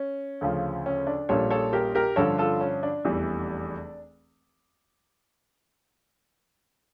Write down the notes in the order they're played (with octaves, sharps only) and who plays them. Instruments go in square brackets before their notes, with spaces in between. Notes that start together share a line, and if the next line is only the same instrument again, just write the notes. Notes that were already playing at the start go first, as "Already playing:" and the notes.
Already playing: [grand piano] C#4
D2 C#3 F3
C#4
D4
A#1 A#2 G3 C#4 A4 C#5
A4 C#5
G4 A#4
G4 A#4
G2 D3 F3 C#4 A4 C#5
F4 A4
C#4
D4
F1 E2 E3 G3